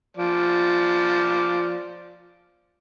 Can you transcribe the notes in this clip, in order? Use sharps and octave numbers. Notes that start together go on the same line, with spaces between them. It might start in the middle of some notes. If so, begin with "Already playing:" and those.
F3 D5